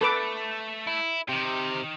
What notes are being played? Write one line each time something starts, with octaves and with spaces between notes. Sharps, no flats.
A3 A4 B4 D6
E4
C3 D#4 G5